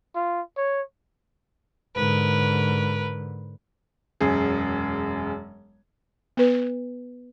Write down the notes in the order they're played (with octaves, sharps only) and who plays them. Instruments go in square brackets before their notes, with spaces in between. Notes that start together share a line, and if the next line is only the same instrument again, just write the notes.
[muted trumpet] F4
C#5
[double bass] G#2 D3 [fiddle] A#4 B4
[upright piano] E1 F#2 G#4
[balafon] B3 B4